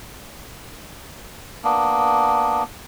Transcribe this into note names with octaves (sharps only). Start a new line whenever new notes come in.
A#3 B3 D4